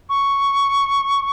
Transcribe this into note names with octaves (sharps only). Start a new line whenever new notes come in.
C#6